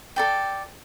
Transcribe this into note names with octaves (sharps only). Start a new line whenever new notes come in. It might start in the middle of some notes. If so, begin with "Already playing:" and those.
A4 D5 G5